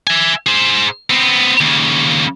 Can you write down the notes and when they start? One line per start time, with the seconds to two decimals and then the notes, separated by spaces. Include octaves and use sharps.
0.07 E5 G#5
0.46 G#4 C5
1.10 B3 C4
1.61 D#2 C#3